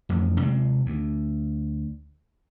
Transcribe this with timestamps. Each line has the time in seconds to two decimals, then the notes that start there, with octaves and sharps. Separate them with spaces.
0.09 A1 F2
0.40 C3 G#3 C4
0.86 D2